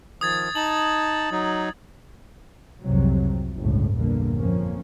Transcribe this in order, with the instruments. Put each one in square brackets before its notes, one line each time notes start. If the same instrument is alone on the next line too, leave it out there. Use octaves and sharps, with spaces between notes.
[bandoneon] D#3 F3 [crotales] D#6 G#6 A6
[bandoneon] D#4 A5 [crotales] F#7
[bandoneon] F#3 D#4
[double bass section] C2 F2 G#2 C3 F#3
G1 C#2 A2
A#1 E2 G2 D3 A#3
F2 F3 A#3 C#4